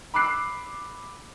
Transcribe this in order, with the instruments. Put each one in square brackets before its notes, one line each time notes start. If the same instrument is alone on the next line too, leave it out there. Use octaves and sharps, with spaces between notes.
[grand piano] B5 D6 E6 F#6 C7